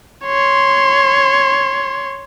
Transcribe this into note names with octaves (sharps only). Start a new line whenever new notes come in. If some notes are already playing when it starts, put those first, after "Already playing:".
C#5 C6